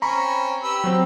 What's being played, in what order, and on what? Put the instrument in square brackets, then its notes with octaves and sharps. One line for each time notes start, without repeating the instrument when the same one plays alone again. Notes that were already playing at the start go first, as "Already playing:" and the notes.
[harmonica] C4 C#4 [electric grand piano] A#5 B5 C#6
[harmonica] G4 B4 E6
[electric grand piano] F#3 C4